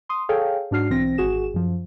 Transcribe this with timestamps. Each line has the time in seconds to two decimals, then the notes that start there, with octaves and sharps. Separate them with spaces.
0.09 C6 D#6
0.29 G#4 A4 C#5 F5 G5
0.71 G#2 D4 F#4 F6 C7
0.90 B1 E3 C4 A#6
1.18 G#1 F#4 G#4 E7
1.54 F#2 F3